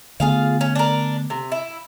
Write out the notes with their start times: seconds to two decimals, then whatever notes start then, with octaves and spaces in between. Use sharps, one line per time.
0.20 D3 A3 B3 F4 G#4 F5
0.61 C#4
0.75 D4 A#4
1.30 C3
1.52 E4